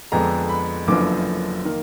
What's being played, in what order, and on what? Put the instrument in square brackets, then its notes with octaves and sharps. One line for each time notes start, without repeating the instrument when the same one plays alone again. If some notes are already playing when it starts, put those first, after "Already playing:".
[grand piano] F2 D3 G#3 B3 D4 A#5
B5
F#1 F#2 D3 F3 B3 D6
D#3 A#3